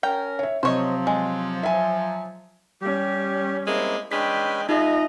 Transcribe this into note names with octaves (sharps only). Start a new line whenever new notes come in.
C#4 A#4 G5 A#5
C#5 E5
C3 F3 F#3 C5 C#5 D#5
G#3
E5 G#5
G3 C#4 G4
G#3 A#3 C4 E4
G#3 C#4 D4 B4 G5 B6
G#3 D#4 F4 D#5 E5 A#5